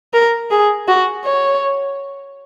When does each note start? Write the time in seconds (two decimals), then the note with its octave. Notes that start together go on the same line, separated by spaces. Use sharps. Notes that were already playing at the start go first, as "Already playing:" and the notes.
0.14 A#4
0.51 G#4
0.88 F#4
1.25 C#5